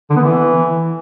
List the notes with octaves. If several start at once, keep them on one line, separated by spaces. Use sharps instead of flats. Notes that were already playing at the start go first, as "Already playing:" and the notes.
D3
B3
E3